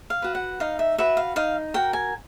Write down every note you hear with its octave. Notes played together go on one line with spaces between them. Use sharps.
F5
F#4 B4
F#5
D#4 F5
E5
F#4 B4 E5
F5
D#4 F5
F#4 A#4 G5
G#5